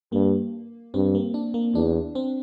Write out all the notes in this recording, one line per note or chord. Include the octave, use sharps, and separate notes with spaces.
G2 A#3
G2 C4
A#3
D4
A#3
E2 D4
C4